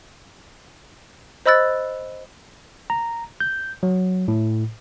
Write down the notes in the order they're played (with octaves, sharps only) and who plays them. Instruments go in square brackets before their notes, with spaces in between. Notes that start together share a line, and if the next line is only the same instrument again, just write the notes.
[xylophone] C5 D#5 B5 E6 F#6 A6
[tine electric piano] A#5
G6
F#3
A2